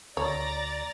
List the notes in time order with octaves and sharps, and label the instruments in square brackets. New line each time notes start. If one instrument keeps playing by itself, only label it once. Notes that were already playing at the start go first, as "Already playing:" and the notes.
[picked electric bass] D2 [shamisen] C#5 [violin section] D5 A#5 A6